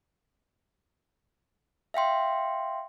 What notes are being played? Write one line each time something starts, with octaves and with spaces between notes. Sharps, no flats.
E5 F5 G5 C6